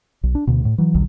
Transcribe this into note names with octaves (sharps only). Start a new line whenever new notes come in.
B1
D4
D2 B2
A2
E3 F#3
A#1 D#2 D3 F#3